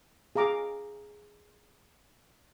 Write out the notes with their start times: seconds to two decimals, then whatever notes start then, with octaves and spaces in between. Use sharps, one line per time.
0.36 G#4 F5 A#5 D6